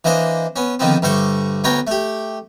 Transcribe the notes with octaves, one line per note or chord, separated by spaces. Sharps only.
E3 A#3 D4 C5 D#5
B3 C#4
D3 D#3 F3 B3 C4
G2 D3 A3 C5 C#6
D2 B3 C#5 G5 A#5
A3 G4